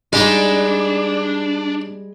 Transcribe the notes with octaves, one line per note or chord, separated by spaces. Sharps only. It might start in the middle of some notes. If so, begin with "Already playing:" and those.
G3 G#3 D4 D#4 G4 F5